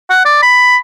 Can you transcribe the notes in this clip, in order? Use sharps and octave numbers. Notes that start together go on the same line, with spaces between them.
F#5
D5
B5